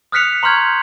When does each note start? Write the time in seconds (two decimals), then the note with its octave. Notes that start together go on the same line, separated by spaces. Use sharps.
0.12 D#6 F6 F#6 B6 C#7 F7
0.43 A#5 C6 C#6 F6 G6 G#6